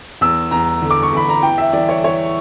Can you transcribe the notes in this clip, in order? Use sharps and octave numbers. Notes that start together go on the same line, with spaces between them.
E2 E6
E2 A#5
D3
D6
C#6
E2 B5
A#5
E3 G5
E5
E3 D5
C#5
E3 C#5